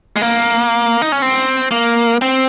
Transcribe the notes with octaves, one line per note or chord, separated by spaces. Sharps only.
G#3
A#3
D#4
C#4
C4
A#3
C4